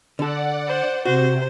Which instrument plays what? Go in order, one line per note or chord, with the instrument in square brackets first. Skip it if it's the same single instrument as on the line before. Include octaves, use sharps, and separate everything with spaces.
[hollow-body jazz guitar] D3 A4 [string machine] D5 F#5
[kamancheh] C5
[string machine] C3 [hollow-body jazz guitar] F#4 [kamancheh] C5